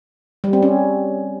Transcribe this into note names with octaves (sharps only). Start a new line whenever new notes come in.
G3
C4
C#4